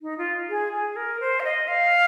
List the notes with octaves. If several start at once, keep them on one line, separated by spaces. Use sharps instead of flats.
D#4
F4
G#4
G#4
A#4
C5
F5
D#5
F5